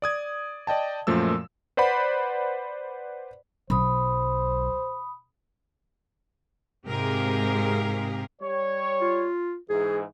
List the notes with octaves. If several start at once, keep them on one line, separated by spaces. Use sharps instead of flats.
D5 D#6 G#6
D5 D#5 G5 A5
F#2 A#2 F3 A3 E6
B4 C5 D5 F#5 B5
B1 C5 B5 D#6
G#2 C3 G4 G#4 A#4 F5
G3 C#5
F4
G#2 E3 G#4